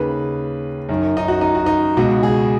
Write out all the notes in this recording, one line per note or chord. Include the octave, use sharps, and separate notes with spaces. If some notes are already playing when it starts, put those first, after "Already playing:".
Already playing: D#2 C#3 B4
F#2 D#3
D#4
F#4
D#4
F#4
D#4
C#2 B2 F#4
G#4